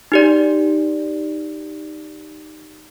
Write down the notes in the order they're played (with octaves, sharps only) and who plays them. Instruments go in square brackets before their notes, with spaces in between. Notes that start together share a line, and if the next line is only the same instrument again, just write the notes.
[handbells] D#4 G4 D5